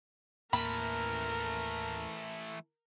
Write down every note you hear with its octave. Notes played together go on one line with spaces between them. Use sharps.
D#2 A2 E3 A3 A#3 A#4 B5